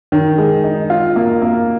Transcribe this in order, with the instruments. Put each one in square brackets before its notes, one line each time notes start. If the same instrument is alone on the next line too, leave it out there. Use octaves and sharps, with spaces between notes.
[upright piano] D#3
G#3
D#4
F4
A#3
A#3